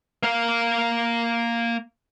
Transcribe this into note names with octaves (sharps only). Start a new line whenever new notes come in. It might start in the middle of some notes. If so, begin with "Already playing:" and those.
A#3 F5